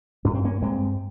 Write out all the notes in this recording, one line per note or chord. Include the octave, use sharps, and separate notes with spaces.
G2 C#4
C4
A#3 C#4
G2 G#3 C4